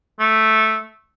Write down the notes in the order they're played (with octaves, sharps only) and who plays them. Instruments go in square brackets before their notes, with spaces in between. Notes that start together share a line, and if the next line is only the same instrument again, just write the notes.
[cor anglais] A3